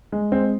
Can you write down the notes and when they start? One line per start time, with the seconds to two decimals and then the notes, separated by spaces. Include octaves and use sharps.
0.12 G#3
0.32 G#3 C4